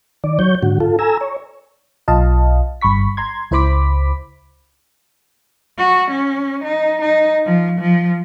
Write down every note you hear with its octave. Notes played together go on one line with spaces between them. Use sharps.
D#3 D5
F#3 C#5 G6
G#2 D3 F#4
F4 A4
A4 G#5 A#5 E6
C#5
B1 F4 D#5 F5 A5
G1 G2 B5 C#6 B6
A#5 C6 G#6
C#2 E4 C5 B5 D6 B6
F#4
C#4
D#4
D#4
F3
F3